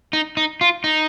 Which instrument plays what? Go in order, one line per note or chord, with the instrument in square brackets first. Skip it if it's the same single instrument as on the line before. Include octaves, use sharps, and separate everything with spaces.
[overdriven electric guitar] D#4
D#4
F4
D#4